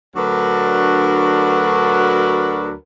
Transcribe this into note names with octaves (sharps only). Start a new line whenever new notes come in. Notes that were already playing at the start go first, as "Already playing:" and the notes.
D2 F#3 D4 F#4 A#4 B4